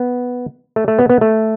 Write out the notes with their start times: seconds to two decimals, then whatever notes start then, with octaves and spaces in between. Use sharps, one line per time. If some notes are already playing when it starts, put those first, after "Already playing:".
Already playing: B3
0.76 A3
0.88 A3
0.99 B3
1.09 B3
1.21 A3